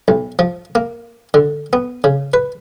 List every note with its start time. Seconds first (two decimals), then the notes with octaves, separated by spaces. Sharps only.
0.08 B1
0.39 F3
0.75 A#3
1.34 D3
1.73 B3
2.04 C#3
2.34 B4